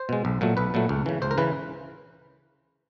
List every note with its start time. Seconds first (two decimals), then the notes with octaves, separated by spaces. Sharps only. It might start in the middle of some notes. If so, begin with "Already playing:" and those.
Already playing: C5
0.09 B2 G#3
0.25 B1
0.41 A#2 F#3 A3
0.57 B1 B4
0.74 A#2 F#3 A3
0.89 C#2
1.06 C#3 E3
1.22 C#2 C5
1.31 A#4
1.38 C#3 E3 B4